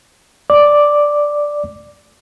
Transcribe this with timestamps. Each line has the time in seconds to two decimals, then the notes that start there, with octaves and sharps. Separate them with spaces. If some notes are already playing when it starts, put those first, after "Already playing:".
0.50 D5 D6